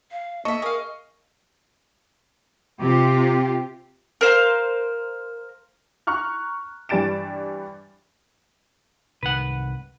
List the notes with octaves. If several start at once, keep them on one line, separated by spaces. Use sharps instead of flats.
F5
A#3 A4 D#5 E5 C#6
G#4 A#4 F5
C3 C4 F4 G4
A#4 C5 F5
A#5 C#6 F6 F#6
G2 E3 G3 A6 D7 E7
C2 G#2 D#3 B4 F#5